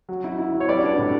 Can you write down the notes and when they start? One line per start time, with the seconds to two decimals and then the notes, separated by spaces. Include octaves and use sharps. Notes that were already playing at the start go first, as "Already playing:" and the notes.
0.09 F#3
0.24 E4
0.38 E4
0.54 F#3
0.60 C#5
0.68 G3 B4 D5
0.83 D4
0.99 A2